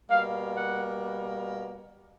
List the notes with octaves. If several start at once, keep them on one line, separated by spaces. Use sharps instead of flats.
B2 G3 A#3 F5
F#5